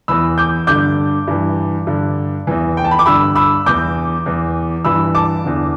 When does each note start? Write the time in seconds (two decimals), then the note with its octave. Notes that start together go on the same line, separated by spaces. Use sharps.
0.08 E2 E3 B5 E6
0.38 D6 G6
0.67 G2 D3 D6 G6
1.28 G2 E3
1.87 G2 D3
2.47 E2 E3
2.77 G5
2.85 A5
2.91 B5
2.99 D6
3.06 G2 D3 B5 E6
3.35 B5 E6
3.66 E2 E3 D6 G6
4.26 E2 E3
4.85 G2 E3 B5 E6
5.15 A5 D6
5.44 E2 D3